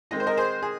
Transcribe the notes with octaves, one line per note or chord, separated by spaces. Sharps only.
D#3 G#3 C4 D#4 D#5
C5
A#4 D#5
G#4 C5
G#4